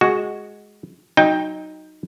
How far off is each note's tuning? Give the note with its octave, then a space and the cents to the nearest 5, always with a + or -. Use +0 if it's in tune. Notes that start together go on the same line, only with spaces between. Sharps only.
G#3 +0 F#4 +0
F#3 +0 D#4 +0 G5 +15